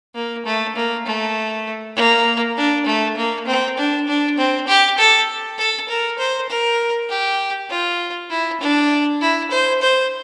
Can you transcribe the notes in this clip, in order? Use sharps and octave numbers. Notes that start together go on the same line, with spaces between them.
A#3
A3
A#3
A3
A#3
D4
A3
A#3
C4
D4
D4
C4
G4
A4
A4
A#4
C5
A#4
G4
F4
E4
D4
E4
C5
C5